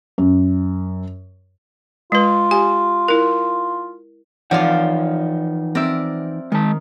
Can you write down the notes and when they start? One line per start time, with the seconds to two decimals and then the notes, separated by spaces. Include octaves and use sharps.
0.18 F#2
2.12 G#3 F4 B4
2.51 G4 G#5
3.08 E4 A#4
4.51 E3 F3 D#4 F4 C#5 D5 F5 F#5
5.75 C4 A#4 D5 E5
6.52 D#3 G#3 A5